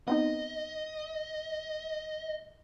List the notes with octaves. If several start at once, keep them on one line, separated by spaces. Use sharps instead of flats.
B3 C4 D#4 D#5